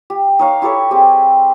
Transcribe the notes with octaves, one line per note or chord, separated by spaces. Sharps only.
G4
D#4 C#5 F5
E4 G4 A4 C#5
G3 C4 G4 G#4